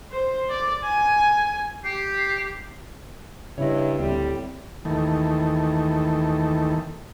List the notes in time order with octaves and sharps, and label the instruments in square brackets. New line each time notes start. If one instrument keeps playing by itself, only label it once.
[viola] C5
D5
G#5
[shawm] G4 [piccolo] C7
[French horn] G2 [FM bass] C#3 [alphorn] E4 [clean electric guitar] C#5 D#5
[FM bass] D2 [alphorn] A2 [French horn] G3 [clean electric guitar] C4
[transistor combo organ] D#2 D#3 E3 A3